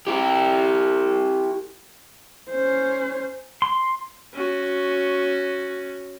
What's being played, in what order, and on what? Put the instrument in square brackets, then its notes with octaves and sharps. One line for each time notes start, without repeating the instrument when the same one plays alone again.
[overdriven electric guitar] E4 G4
[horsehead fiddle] C#4 C5
[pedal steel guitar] C6
[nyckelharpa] C#4 F#4